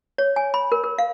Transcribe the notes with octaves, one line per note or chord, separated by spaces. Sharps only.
C#5
G#5
B5
A#4
A#4
F5